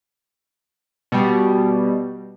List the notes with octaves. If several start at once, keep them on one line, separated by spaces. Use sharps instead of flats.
B2 G3